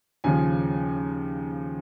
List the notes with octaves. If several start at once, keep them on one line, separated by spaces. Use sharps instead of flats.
D#2 C#3 F3 G#5